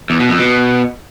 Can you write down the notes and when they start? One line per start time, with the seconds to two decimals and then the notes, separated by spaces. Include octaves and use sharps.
0.10 E2
0.20 B2
0.29 F2
0.39 B2